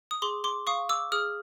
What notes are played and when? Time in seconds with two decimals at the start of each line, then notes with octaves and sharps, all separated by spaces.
0.11 D#6
0.22 G#4 C6 D6
0.44 C6 D6
0.67 F5 C#6 D#6
0.89 D6 E6
1.12 G#4 D#6 F6